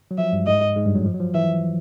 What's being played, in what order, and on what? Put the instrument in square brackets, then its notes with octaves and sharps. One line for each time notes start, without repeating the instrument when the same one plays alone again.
[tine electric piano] F#3
[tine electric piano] F3 [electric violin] E5
[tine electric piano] G2 G3
[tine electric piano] G#2 G#3 [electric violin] D#5
[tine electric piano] G#2 G#3
G2 G3
F#2 F#3
F3
F#3
F3
[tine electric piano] E3 [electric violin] E5